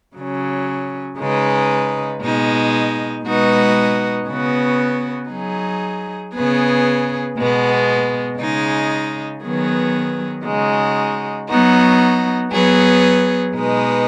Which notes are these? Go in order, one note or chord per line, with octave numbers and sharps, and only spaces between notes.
C#3 F#3 C#4
C#3 G#3 D#4 B4
B2 G#3 D#4
B2 G#3 D#4 F#4 B4
C#3 B3 F#4 B4
F#3 D#4 G#4
C#3 B3 G#4 B4
B2 G#3 B3
C#3 G#3 D#4
D#3 F#3 B3 G#4 B4
C#3 G#3 D#4 F#4
F#3 B3 D#4 F#4
F#3 B3 G#4 B4
B2 G#3 D#4 B4